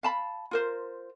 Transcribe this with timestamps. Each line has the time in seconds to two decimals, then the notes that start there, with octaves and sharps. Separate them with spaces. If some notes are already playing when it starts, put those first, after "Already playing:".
0.03 F5 A5 B5
0.51 F4 A#4 C5